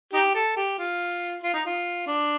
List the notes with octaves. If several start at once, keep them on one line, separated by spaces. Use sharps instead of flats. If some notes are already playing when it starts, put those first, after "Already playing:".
D#4 G4
A4
G4
F4
F4
D#4
F4
D4